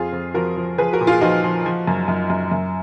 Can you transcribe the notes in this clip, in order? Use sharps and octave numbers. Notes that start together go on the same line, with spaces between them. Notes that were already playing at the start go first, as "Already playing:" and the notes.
Already playing: F2 F4 G#4
F2
F3 F#4 A#4
F3
F3 G#4 B4
F#4 A#4
A#2
F4 G#4
F3 D#4 F#4
F3
F3
F#2
F#2
F#2
F#2